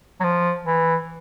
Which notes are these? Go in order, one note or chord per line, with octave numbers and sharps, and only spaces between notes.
F#3
F3
E3